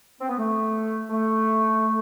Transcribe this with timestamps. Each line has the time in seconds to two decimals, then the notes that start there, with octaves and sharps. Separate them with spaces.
0.20 C4
0.29 B3
0.38 A3
1.10 A3